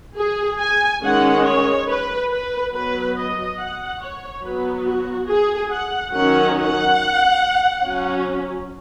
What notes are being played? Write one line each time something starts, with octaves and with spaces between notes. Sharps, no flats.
G#4
G#5
D#3 G#3 C#4 F#5
C#5
B4
B4
F#3 B3 B4
D#5
F#5
C#5
F#3 B3 B4
F#4
G#4
F#5
D#3 F#3 C#4 F#5
F#5
F#3 C#4